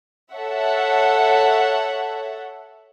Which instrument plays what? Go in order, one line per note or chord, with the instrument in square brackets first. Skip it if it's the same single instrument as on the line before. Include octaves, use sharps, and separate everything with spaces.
[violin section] A4 C#5 E5 F#5